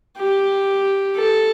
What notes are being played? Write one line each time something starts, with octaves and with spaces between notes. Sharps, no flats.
G4
A4